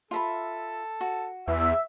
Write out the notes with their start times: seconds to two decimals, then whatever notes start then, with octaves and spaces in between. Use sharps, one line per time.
0.11 F4 A4 E5 B5
1.01 F#4
1.48 E2 E5